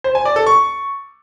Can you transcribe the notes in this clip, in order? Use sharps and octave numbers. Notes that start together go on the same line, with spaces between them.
C5
G#5
D5
A4
C#6